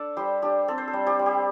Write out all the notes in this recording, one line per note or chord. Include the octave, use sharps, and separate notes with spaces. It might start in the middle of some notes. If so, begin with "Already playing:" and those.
Already playing: D4 A4 D5
G3 G4 C5
D4 G4
C4 A4
C5
A4
G3
G4 C5
G3
G4